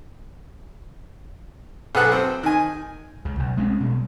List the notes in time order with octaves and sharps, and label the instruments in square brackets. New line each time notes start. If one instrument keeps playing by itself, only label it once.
[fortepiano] B1 G#4 A4 B4 F#5 F#6
C4
D#3 G#5
[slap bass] C#2 C#3
B1
G#3 C4 C#4
B2 G3